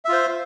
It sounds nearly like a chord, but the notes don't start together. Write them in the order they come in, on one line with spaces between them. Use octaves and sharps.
E5 F4 C5